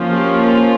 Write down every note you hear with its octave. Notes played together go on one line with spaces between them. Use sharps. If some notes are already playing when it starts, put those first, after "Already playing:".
Already playing: F3 A#3 C#4
G4
F4